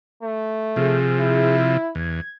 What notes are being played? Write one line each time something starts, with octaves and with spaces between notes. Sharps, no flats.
A3
C3 F3 G#4
E4
E2 G#6